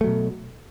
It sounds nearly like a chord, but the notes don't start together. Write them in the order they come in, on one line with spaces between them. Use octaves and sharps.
A3 F#3 B2